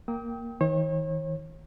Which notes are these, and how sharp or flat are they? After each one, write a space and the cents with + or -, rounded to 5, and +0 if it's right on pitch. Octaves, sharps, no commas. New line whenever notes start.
A#3 +0 G5 +0 D#6 +45
D#3 +40 C#5 -40